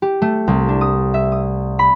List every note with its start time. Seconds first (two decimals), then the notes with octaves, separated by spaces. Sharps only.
0.02 G4
0.22 A3
0.48 C2
0.69 D4
0.81 D#6
1.14 E5
1.32 D#6
1.79 B5